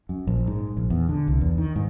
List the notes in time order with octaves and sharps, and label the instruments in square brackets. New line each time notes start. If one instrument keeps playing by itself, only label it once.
[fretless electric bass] F#2
A#1
G#2
A#1
E2
D3
C2
E2
D#3
G#2